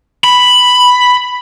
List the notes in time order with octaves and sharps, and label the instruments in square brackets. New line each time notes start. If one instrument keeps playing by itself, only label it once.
[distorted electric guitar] B5